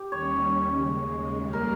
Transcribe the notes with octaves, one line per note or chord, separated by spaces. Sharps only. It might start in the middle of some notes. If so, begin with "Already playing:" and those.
Already playing: G4
D#2 D#3 G3 C#4 C#5
D#2 C#3 G#3
F2 D#3 G3 A#3
A#4